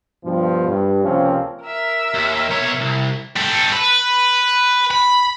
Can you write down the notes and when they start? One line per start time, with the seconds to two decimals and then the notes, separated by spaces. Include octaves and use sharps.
0.24 G2 B2 F3
0.68 G2
1.04 C#2 C3 F3 A#3 C4 C#4
1.64 A#4 E5
2.14 D#2
2.50 B1 C#5
2.81 C2
3.36 G3 A4
3.73 B4
4.91 B5